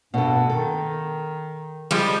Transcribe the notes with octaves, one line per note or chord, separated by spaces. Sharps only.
G2 B2 A4
D#3 A4
F3 G3 G#3 C4